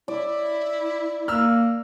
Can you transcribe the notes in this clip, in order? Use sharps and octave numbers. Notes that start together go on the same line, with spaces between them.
E4 D5
A#3 E6 F6